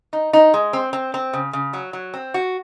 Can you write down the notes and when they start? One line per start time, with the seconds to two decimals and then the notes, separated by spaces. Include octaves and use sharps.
0.13 D#4
0.33 D#4
0.54 G#3
0.73 C4
0.93 C4
1.14 C4
1.33 C#3
1.53 C#3
1.73 F#3
1.93 F#3
2.14 C4
2.34 F#4